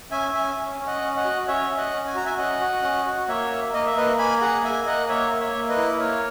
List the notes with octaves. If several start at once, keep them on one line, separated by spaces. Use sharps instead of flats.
C#4 E5 G#5
C#4 E5 G#5
C#4
C#4
D#5 F#5
C#4
D#5 F#5
F#4
C#4 C#5 E5
C#4
D#5 F#5
C#4
G#5
F#4 A#5
E5 G#5
C#4 D#5 F#5
F#4
C#4
F#4
A#3 C#5 E5
A#3
A#3 D#5
E5
A#3 B4 D#5
A#3 G#5 B5
G#4 F#5 A#5
A#3 E5 G#5
A#3 D#5 F#5
A#3 C#5 E5
A#3
C#5 E5
A#3
B4 D#5
E4
A#3 A#4 C#5